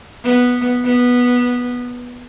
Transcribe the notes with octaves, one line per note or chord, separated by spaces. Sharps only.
B3
B3